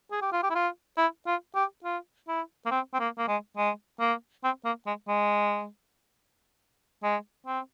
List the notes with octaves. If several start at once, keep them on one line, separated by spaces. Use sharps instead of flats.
G#4
G4
F4
G4
E4
F4
E4
F4
G4
F4
E4
A#3
C4
C4
A#3
A#3
G#3
G#3
A#3
C4
A#3
G#3
G#3
G#3
C4